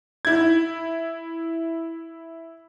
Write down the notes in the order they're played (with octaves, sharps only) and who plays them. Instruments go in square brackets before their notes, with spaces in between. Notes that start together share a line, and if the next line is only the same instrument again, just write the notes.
[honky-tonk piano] E4 G#6